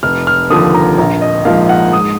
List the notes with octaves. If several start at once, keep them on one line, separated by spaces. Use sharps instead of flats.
F1 F6
F6
D#2 D3 F3 D#6
A#5
A#1 A#5
D#5
G#2 F3 A#3 F5
F#5
G#2 D#6